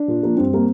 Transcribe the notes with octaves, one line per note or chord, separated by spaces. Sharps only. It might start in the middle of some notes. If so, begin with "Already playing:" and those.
Already playing: D4
A#2
F3 A#3
G2 C4
G3 A#3